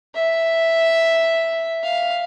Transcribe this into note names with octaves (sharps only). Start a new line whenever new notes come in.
E5
F5